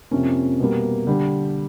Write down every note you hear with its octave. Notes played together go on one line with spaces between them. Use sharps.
F2 C3 F3 A#3 C#4
B2 G3 A#3
D3 G3